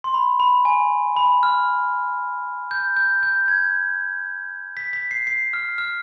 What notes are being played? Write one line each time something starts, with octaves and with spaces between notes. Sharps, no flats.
C6
B5
B5
G#5
B5
F6
G6
G6
G6
G#6
B6
B6
C7
C7
F6
F6